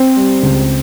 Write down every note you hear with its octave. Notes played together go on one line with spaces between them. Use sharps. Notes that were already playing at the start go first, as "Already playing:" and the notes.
Already playing: C4 C5
G3
C#2